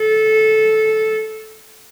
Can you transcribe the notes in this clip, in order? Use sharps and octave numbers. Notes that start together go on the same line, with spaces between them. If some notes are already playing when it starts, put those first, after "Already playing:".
Already playing: A4